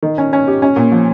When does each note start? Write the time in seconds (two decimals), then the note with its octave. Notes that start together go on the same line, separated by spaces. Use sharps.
0.03 D#3
0.18 C#4
0.33 C#4
0.47 G4
0.62 C#4
0.76 A#2
0.92 F3